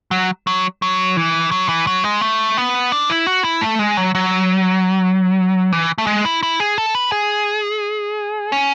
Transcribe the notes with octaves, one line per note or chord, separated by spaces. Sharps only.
F#3
F#3
F#3
E3
F#3
E3
F#3
G#3
A3
B3
D4
E4
F#4
E4
A3
G#3
F#3
F#3
E3
A3
G#3
E4
E4
G#4
A4
B4
G#4
C#4